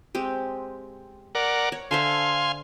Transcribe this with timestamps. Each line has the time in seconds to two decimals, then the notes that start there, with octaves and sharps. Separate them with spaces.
0.15 G#3 C4 G4
1.35 A#4 D5 F#5
1.72 C#5
1.91 D3 C5 E5 F5 G#5 C6